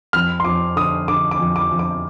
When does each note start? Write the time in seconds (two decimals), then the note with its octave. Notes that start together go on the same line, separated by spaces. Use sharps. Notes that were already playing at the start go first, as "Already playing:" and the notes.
0.13 F2 F6
0.40 C6
0.45 F2 D6
0.76 D3 D#6
1.08 D3 D6
1.31 D6
1.40 F2
1.56 D6
1.71 F2
1.79 D6